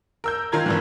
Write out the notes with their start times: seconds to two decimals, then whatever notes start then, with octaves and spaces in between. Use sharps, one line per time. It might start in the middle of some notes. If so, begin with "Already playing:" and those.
0.24 A#4 E6 G6
0.52 D#3 F4 A#5 G#6
0.66 F#1 G2 E3